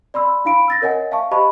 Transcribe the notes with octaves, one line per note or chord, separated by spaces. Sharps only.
D5 B5 C6 E6
D4 E4 F5 B5 D7
E6 A6 A#6
A#4 C#5 D#5 F#5 G#5
E5 F5 G#5 A5 C#6
G4 C5 D#5 A5 B5 C#6